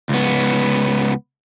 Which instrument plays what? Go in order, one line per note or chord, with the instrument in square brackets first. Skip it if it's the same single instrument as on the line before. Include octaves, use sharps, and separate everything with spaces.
[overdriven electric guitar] C#2 B3